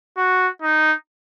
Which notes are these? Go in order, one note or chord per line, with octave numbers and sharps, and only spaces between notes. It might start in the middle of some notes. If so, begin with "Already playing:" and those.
F#4
D#4